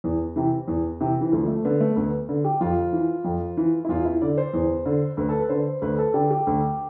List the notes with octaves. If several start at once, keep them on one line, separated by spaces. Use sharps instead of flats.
E2
C3 E3
E2
C3 E3
E3
D2 F3
A3
D3 B3
A3
D2 B3
D3
G4
F2 F4
E3
F2
E3
E4
E2 F4
E4
D3 D5
C5
E2
D3
D2 B4
A4
B4
D3 C5
D2 B4
A4
D3 G4
G4
D2